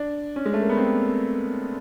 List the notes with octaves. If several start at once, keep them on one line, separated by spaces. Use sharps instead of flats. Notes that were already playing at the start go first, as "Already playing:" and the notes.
Already playing: D4
C#4
G#3
A3
A#3
B3
C4